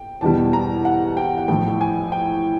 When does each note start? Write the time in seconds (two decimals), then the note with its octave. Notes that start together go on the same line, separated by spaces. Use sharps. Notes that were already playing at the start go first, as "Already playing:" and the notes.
Already playing: G5
0.21 E2 B2 G3 A5
0.53 A#5
0.85 F#5
1.17 G5
1.38 F#5
1.48 A1 A2 F3 G5
1.81 G#5
2.12 G5